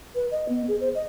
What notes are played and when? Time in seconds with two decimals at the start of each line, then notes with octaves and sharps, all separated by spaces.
0.15 B4
0.31 D#5
0.49 B3
0.68 G#4
0.80 C5
0.95 D#5